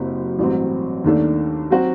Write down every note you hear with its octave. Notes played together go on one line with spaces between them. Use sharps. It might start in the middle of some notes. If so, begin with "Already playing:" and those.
Already playing: F#1 F#2 F#3 C4 G4
A1 G2 F#3 C4
D#2 D#3 A3 D4 A4
F#3 C4 F#4